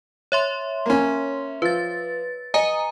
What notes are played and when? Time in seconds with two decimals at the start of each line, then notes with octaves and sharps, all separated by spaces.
0.32 C#5 E5 C6
0.86 A#3 C#4
1.62 F3 B4 A6
2.54 D#5 G#5 A#5 D#6